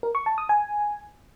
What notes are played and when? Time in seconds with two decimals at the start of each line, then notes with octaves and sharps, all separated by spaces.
0.03 A#4
0.15 C#6
0.26 A5
0.38 D#6
0.49 G#5